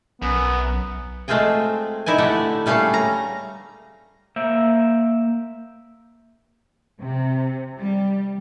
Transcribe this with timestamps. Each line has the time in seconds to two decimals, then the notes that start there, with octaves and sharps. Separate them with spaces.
0.22 B1 F#2 B3
1.28 G#3 A3 C4 F4 G#4 G5
2.06 D#4 E4 D5 G#5
2.18 D3 A3 G4 D5 F#5
2.66 G3 A3 C#4 G#4 F5
2.94 A#5
4.36 A#3 C5 E5
7.01 C3
7.77 G3